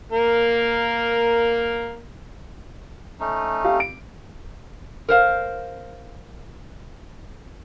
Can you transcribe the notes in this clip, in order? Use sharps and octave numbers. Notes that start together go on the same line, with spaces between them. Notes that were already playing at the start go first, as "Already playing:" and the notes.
A#3 A#4
A3 C#4 D#4
G4 F5
D7
A#4 C5 F5